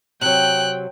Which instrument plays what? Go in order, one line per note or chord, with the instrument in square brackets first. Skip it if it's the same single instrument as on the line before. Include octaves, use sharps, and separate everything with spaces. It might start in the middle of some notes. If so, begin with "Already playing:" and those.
[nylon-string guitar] C3 F#3 [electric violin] G5 [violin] F#6